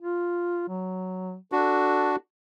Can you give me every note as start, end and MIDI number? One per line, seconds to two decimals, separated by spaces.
0.01 0.64 65
0.68 1.36 54
1.52 2.16 62
1.52 2.16 66
1.52 2.14 69